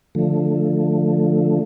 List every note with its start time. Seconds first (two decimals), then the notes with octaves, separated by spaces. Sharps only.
0.15 D3 F3 A3